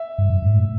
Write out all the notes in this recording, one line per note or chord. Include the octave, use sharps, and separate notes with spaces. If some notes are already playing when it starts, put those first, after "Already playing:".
Already playing: E5
G2
F#2
G#2
A2